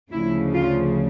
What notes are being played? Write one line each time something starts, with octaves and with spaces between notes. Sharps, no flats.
D2 C#3 F3 E4
F4